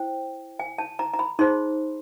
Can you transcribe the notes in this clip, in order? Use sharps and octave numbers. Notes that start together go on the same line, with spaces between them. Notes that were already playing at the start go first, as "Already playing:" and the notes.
Already playing: E4 C5 G5
G#5
A5
A#5
A#5
B5
D#4 G#4 C5 C6